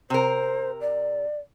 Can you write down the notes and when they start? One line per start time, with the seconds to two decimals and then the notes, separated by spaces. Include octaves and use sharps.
0.10 C3 A#4 C5
0.81 D5